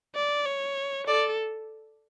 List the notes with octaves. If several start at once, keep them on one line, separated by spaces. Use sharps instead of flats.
D5
C#5
A4 D5